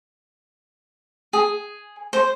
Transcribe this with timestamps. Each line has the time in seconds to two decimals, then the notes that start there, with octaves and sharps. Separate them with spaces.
1.33 G#4
2.13 C5